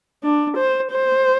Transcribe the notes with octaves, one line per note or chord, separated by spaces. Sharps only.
D4
C5
C5